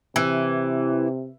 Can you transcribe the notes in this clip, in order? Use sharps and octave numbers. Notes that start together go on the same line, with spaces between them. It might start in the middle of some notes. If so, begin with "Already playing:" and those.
C3 E3